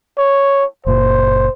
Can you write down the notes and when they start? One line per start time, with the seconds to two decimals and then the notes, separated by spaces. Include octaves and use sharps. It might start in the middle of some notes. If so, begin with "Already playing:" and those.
0.18 C#5
0.87 F#1 A#2 C5